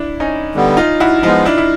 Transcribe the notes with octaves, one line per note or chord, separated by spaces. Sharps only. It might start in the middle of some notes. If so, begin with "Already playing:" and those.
Already playing: D4 E4
C#4 D#4
D3 G3 B3
D#4 F4
E4 F#4
F3 G#3 B3 D#4 F4
D4 E4
E4